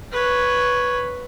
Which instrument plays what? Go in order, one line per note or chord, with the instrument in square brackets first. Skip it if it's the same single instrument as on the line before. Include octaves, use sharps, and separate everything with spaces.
[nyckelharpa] B4 C#5